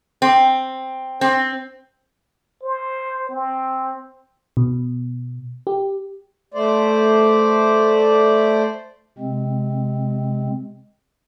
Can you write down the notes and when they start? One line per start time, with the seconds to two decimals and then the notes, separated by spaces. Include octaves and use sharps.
0.22 C4
1.21 C4
2.63 C5
3.30 C4
4.57 B2
5.67 G4
6.54 A3 C5 D5
9.19 C3 G#3 C4